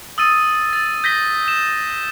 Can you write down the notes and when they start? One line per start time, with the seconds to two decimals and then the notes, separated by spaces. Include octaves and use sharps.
0.18 D#6 E6 A6 D#7
0.73 A6
1.04 G6 A#6 B6 G7
1.48 E7